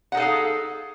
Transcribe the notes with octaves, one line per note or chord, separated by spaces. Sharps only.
D#4 G#4 A4 F5 F#5